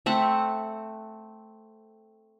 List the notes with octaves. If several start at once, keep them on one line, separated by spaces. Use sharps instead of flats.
A3 C4 E5 F#5